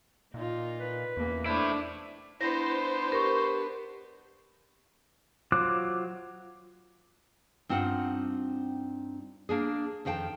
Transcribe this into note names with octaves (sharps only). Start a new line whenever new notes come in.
A#2 D#4 F4
B4
E2 A#3 C#4
A3 D4 E4 C5
B3 D4 E4 C5 A#6
G4 A#4 C#6
F#3 F4 C5 D6 F#6
G2 C4 D#4 F4 F#5
A#3 D4 G#4
F2 D#3 F5 G5 A5